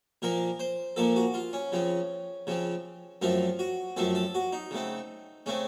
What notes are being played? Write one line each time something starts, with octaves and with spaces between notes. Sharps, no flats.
A#2 F3 A#3 A#4
C5
A#2 F3 A#3 A4
F#4
F4
C#4
C#3 F3 C4
C#3 F3 C4
F#2 F3 A3 C4 F4
F#4
F#2 F3 A3 C4 A4
A4
F#4
D#4
C#3 A3 C4
C#3 A3 C4 C#4